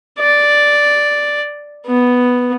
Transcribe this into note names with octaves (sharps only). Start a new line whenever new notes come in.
D5
B3